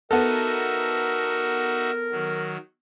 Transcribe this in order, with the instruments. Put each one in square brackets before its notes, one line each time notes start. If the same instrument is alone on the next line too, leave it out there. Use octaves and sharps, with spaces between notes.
[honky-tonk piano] B3 A4 [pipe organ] D#4 F#4 E5 [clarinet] A#4
[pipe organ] D#3 F#3